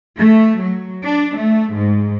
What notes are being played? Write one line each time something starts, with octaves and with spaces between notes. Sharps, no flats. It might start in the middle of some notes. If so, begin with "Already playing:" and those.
A3
F#3
D4
A3
G#2